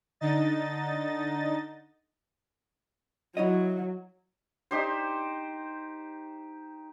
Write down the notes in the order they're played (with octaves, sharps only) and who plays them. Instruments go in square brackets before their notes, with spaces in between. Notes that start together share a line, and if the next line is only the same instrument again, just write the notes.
[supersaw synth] D3 D#4 D#5 A6
[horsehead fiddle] F#3 [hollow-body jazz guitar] E4 C#5 D#5
[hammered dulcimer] D#4 G4 C5